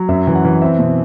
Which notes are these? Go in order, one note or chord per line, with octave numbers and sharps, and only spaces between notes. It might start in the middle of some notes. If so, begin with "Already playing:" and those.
Already playing: F#3
F#2 E5
E3
F#5
E3
C4 E5
B2